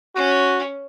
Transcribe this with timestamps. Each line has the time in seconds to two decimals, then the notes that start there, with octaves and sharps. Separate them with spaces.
0.16 C#4 F#4